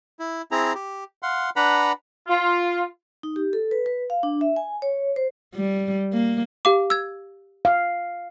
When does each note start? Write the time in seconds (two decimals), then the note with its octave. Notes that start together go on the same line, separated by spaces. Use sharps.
0.19 E4
0.51 C4 E4 G#4 A#5
0.75 G4
1.23 F5 F#5 C6
1.56 D4 B4 F#5 A#5 B5
2.28 F4
3.23 D#4
3.36 G4
3.53 A4
3.71 B4
3.86 B4
4.10 F5
4.23 D4
4.41 E5
4.56 G#5
4.82 C#5
5.16 C5
5.54 G3
6.13 A#3
6.65 G4 F5 D6
6.90 E6 G#6
7.65 F5